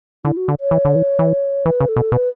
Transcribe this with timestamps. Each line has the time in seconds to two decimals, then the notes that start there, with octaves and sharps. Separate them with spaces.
0.25 D3 E4
0.37 F#4
0.48 D3
0.60 C#5
0.71 E3
0.85 D3
0.95 E3
1.19 E3
1.65 E3 B4
1.80 C#3
1.89 A4
1.96 B2
2.12 B2 B4